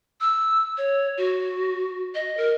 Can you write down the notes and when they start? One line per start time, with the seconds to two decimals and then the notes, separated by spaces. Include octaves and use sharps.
0.21 E6
0.77 C#5
1.17 F#4
2.15 D#5
2.37 A#4